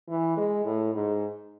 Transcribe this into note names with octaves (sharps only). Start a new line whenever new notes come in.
E3
G#3
A2
G#2